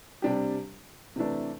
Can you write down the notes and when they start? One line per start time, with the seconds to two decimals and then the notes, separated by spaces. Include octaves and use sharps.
0.22 C3 G3 D4 G4
1.16 C3 E3 A3 D4